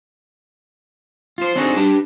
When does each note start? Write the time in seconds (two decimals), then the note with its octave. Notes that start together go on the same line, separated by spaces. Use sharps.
1.38 F4 C5
1.56 C4 D4 D#4 F#4 G#4 A4
1.76 D4 G4 B4 A5